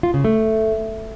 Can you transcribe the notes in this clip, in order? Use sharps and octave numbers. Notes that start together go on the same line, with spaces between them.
F4
C#3
A3